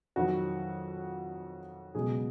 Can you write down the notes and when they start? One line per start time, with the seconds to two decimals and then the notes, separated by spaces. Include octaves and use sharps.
0.16 F2 D#3 F#3 F#4
1.95 C#2 B2 F#3 G#4